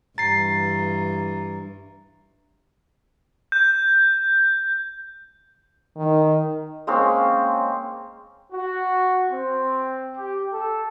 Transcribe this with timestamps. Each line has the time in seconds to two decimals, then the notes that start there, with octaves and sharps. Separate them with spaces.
0.18 G2 E3 A#5 A6 C7
3.52 G6
5.97 D#3
6.87 G#3 A#3 C4 C#4
8.53 F#4
9.31 C4
10.15 G4
10.52 A4